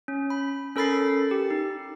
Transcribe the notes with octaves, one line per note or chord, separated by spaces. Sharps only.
C#4
B5
C#4 A4 A#4 B5 A6 C7
G4
D#4